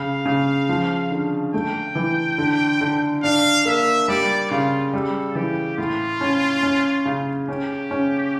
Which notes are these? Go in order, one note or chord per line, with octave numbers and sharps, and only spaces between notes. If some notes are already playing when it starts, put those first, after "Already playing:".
Already playing: C#3 F5
C#3
F3
D3
A3 G5
E3
D3
D3
D4 F5
A#3 E5
G3 D5
C#3 F4
G3 A4
E3 G4
A2 F4
C#4
C#4
C#3
C#4 G4
C#4